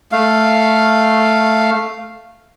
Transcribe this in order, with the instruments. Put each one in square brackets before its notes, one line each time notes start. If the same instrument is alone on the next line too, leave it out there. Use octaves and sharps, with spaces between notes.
[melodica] A3 F5